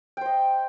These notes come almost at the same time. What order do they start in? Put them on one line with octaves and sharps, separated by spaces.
G5 C5 D#5